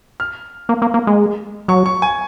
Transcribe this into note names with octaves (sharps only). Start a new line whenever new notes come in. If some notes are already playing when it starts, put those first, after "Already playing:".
F6
A#3
A#3
A#3
G#3
F#3 C#6
C#6
G#5